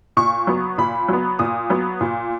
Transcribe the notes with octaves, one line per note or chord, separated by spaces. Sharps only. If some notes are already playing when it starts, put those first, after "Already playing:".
A#2 C#6
F#3 B3
A#2 B5
F#3 B3
A#2 D#6
F#3 B3
A#2